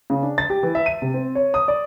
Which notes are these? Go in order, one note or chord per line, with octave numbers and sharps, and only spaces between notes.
C#3
D4
A6
G4
E3
E5
D#7
C3
C4
C#5
D#6
D5